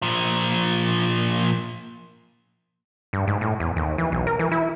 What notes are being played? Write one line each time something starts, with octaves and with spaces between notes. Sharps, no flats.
A#2 F3
G2
G#2
A2
E2
D#2
E3
B1
A#4
E3
E4